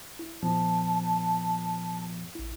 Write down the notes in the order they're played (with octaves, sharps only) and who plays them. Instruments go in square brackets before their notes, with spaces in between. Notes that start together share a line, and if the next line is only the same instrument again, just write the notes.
[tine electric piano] E4
[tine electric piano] A#2 F3 B3 [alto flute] A5
[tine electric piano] A1 E4